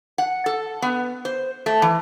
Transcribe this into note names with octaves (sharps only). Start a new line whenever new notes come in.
F#5
A4
B3
C5
A3
E3